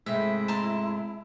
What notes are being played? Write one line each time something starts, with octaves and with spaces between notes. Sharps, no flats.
G#2 C3 G#3 A3 E4 E5
A5 A#5 C6